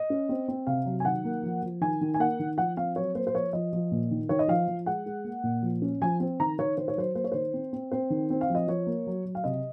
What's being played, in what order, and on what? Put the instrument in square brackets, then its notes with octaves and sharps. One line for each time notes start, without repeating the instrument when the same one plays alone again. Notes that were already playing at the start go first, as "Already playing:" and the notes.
Already playing: [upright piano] D#5
C#4
C4
C4
C3 F5
F#3
G#5
D#3 F#5
A#3
F3
F3
D#3 G#5
D#3
G#5
A#3 F#5
D#3
F3 F#5
C4 F5
F#3 C#5
A#3 C5
C5
F3 C#5
F3 D#5
F3
A#2
D#3
D#3 C#5
D#5
F3 F5
F3
G#3 F#5
G#3
A#3
A#2
F3
C#4
F3 G#5
C4
D#3 A#5
D#3 C#5
D#3 C5
C#5
F#3 C5
A#3 C5
C#5
D#3 C5
C4
C4
C4 C5
D#3
C4
F5
F3
D#5
F3 C#5
A#3
F#3
F#3
F5
C3 D#5